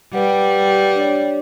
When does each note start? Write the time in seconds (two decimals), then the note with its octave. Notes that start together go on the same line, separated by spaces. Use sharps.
0.13 G3 B4 F#5
0.95 D4 C#5 D5